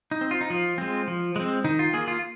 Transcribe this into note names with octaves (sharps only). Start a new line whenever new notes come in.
D#4
C4
F4
D#4
F3 F4
G#3 C4
F3
G#3 C4
D#3 D#4
F4
A#3 G#4
F4